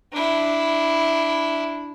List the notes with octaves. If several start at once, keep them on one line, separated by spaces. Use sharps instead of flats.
D4 E4